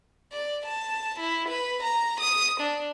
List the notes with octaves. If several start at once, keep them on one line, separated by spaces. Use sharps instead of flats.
D5
A5
E4
B4
A#5
D#6
D4